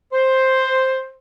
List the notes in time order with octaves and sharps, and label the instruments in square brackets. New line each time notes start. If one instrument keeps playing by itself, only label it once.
[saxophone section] C5